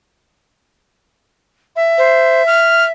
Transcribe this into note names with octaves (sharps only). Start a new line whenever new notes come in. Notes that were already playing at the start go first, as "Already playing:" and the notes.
E5
C5
F6